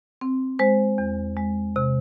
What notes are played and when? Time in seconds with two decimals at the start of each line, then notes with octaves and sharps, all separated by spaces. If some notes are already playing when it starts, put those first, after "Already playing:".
0.21 C4
0.59 G#3 C5
0.98 E2
1.37 G#3
1.76 C3